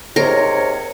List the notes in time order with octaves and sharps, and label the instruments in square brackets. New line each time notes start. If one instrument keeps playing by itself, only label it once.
[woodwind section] G#2 C3 C#5 [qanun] A#4